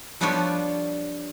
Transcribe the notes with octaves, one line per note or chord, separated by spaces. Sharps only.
F3 G3 B3 D4 F4 C#5